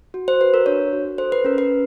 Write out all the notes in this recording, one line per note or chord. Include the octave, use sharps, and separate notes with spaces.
F#4
C5
F#4 B4
A#4
D4 C#5
F#4
A4 C5
B4
C#4 A#4
B4
C#4